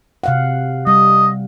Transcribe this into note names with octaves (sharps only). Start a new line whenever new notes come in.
C3 F5 F#5
G3 D#5